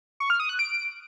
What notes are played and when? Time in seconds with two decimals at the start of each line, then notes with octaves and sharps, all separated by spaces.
0.20 C#6
0.30 F6
0.40 D#6
0.49 F#6
0.59 D7